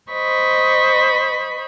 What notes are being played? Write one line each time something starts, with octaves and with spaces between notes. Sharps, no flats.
C5 D#5 B5 C#6